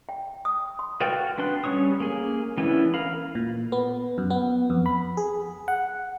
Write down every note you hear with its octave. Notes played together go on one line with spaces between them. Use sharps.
G5
D#6
C6
F#4 B4 D5 F5 G5
B3 D4 B4 C6 F#6
G3 C#4 C#5 C#6 D#6
A#3 G#4
E3 B3 C#4 D4 E4
A#4 F5 B5
A#2
B3
F#2
B3
F2
B5
G#4
F#5